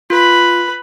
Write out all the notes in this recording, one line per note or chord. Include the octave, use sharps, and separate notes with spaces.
F4 B4 B5